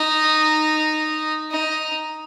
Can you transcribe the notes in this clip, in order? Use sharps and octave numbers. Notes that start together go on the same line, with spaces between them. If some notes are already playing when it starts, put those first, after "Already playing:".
Already playing: D#4
D#4